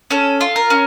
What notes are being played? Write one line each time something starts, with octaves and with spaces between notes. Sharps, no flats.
C#4 A4
F4
A#4
C#4